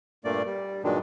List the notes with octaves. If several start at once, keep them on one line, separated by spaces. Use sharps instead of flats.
G2 A#2 A3 A#3 D5
G3
G2 A#2 D#3 F#3 G#3 D4